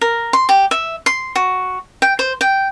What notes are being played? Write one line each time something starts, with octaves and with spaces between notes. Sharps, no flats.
A#4
C6
G4
E5
C6
F#4
G5
C5
G5